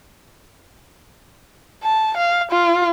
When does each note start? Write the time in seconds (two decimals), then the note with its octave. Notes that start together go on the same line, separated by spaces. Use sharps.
1.83 A5
2.17 F5
2.51 F4